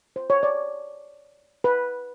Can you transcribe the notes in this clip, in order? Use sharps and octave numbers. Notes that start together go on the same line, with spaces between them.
C5
C#5
D5
B4